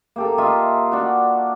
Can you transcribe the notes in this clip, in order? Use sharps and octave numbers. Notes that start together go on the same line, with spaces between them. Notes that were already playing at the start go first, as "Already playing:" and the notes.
A#3 G4 A4
F4 D#5 E5 A#5
D4 F#4